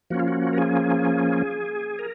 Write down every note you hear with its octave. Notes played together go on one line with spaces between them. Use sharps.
F3 A#3 C#4 F#4
F4
F#4
A#4
G#4
A#4